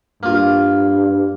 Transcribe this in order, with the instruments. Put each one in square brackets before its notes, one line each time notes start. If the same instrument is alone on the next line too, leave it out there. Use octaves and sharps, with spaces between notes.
[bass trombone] G2 [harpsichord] A#3 F4